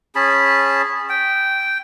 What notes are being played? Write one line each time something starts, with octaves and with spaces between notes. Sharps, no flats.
C#4 G#4 A5 B5
G5